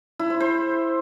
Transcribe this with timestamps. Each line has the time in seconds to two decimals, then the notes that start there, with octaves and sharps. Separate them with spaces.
0.19 E4
0.30 C5
0.40 C5